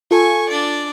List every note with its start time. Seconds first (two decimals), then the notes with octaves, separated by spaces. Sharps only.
0.11 F4 A4 G#5 C#6
0.49 D4 D5